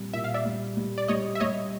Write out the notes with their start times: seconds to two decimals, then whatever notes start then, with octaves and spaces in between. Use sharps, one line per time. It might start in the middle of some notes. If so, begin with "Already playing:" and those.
Already playing: A#2 G3 C4
0.13 A#2 E5
0.24 F5
0.34 D5 E5
0.46 G3
0.77 G3
0.98 D5
1.08 G3 C#5 D#5
1.35 E5
1.40 G3 C#5 D#5